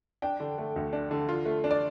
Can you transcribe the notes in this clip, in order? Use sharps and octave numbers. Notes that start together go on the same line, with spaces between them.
D4 G5
D3
A3
D2
D4
D3
F4
A3
D4
D5